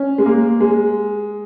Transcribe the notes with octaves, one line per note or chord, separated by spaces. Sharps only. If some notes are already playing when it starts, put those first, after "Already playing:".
Already playing: C#4
G#3
A#3
G#3